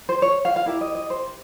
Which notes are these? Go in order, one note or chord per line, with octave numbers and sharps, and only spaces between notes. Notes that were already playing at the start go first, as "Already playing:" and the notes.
C5
C#5
F5
F5
E4 G4 A#4 E5
D#5
D#5
C5